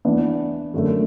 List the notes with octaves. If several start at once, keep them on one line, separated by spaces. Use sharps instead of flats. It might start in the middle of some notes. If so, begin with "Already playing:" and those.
E3 B3 D4
F#2 D3 A3